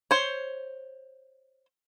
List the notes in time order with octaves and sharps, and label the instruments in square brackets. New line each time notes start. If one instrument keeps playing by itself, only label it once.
[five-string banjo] C5 C#5